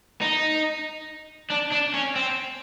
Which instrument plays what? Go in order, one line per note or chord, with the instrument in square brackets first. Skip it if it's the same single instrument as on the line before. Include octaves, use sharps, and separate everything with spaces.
[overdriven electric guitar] D#4
D4
D4
C#4
C4